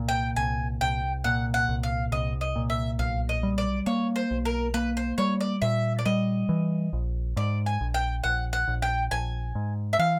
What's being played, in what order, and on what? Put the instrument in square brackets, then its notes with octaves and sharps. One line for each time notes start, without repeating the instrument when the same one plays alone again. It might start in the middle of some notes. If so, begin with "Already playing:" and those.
Already playing: [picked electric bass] C2 A#2
[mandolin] G5
[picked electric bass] C2 [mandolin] G#5
[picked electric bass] C2 [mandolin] G5
[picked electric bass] A#2 [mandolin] F#5
[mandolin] F#5
[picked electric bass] C2
[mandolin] F5
[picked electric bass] C2 [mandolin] D#5
[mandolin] D#5
[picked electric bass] A#2
[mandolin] E5
[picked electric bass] B1 [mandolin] F5
[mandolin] D#5
[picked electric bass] G3
[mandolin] D5
[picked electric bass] A#3 [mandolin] C#5
[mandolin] C5
[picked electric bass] B1
[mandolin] A#4
[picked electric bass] A#3 [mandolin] B4
[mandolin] C5
[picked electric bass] G3 [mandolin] C#5
[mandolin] D5
[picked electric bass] A#2 [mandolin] E5
[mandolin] D5
[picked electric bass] G3 [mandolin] D#5
[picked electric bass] E3
A#1
[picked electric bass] G#2 [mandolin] D5
[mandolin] G#5
[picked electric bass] A#1
[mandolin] G5
[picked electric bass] A#1 [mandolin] F#5
[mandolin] F#5
[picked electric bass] A#1
[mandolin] G5
[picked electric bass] A#1 [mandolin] G#5
[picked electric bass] G#2
[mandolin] E5
[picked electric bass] E3 [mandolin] F5